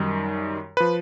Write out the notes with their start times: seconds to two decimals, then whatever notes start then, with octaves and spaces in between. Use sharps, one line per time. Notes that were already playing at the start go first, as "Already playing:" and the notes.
Already playing: F#2 D#3 G3
0.77 F3 B4